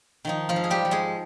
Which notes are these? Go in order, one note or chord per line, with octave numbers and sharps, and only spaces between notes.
D#3 F3 D#4
F3 F4
G#2
G#4
G3 G4
F3
G#3 G#4